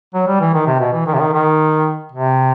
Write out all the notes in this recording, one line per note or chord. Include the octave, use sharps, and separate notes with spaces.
F#3
G3
E3
D#3
C3
B2
E3
D#3
C3
D#3
D#3
C3